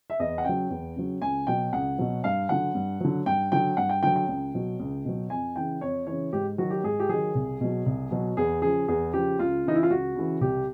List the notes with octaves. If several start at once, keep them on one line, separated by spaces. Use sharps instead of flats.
E5
E2 D#5
F#5
C#3 F#3 G5
E2
C#3 F#3
C#2 G#5
B2 F#3 G5
C#2 F#5
B2 F#3
G2 F5
D3 F#3 F#5
G2
D3 F#3
G2 G5
D3 F#3 G5
G2 F#5
G5
D3 F#3 G5
G5
C#2
B2 F#3
C#2
B2 F#3
F2 G#5
C#3 E3 G5
F2 C#5
C#3 E3 C#5
G#2 G4
D#3 F#3 F#4
G4
G#2 G#4
G4
D#3 F#3 G#4
C2
B2 F#3
C2
B2 F#3
E2 G#4
C#3 F3 G#4
E2 G#4
C#3 F3 G4
C#2 F4
C#3 E3 D#4
E4
F4
C#2 F#4
C#3 E3
C2 G4